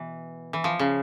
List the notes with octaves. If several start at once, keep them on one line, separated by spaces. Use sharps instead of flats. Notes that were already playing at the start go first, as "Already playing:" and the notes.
Already playing: B2 E3
E3
F3
C#3